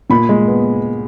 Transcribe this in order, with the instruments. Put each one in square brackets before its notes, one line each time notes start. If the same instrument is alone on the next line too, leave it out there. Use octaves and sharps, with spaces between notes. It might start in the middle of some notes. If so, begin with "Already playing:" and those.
[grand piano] A#2 B5
G#3
B3